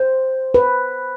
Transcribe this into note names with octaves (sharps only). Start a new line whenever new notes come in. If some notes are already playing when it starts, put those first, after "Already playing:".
Already playing: C5
B4